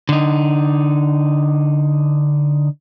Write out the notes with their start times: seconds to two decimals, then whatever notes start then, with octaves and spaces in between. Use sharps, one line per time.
0.09 D3 D#4